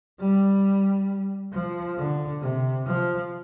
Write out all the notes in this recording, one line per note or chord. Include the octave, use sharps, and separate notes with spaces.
G3
F3
D3
C3
F3